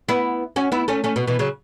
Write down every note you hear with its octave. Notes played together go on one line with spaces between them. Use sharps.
B3 E4
C#4 F#4
B3 E4
A3 C#4
A3 C#4
B2
B2 E3
C#3 F#3